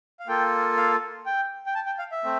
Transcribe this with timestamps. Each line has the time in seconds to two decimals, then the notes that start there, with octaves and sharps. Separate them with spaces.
0.20 F5
0.27 A#3 F4 A4 G5
0.77 F5
1.26 G5
1.66 G5
1.75 A5
1.86 G5
1.99 F5
2.12 E5
2.24 A3 C4